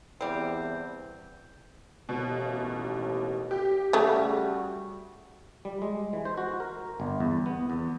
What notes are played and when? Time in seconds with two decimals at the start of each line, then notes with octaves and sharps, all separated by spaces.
0.21 E2 G3 C4
2.09 A1 D#2 B2
3.51 G4
3.93 C#3 G3 A3 F#4
5.65 G3
5.82 G#3
6.13 E3
6.25 C5
6.37 F#4
6.60 A#4
7.00 G1
7.20 E2
7.46 B3
7.70 E2